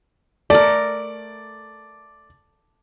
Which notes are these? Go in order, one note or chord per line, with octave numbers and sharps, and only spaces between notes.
A3 A#4 D5